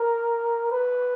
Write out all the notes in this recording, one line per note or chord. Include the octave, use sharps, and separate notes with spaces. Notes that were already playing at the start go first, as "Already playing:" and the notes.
Already playing: A#4
B4